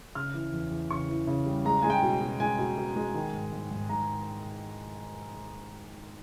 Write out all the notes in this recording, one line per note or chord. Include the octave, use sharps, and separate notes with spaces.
C#3 F6
E3
E2
E2
C#3 C#6
E3
C#3
G3
G#3 A#5
G#3 G#5
G5
B2
B2
G#3 G#5
B2
B2
G#3
D#3
G#2
G#2
G#2
G#2 A#5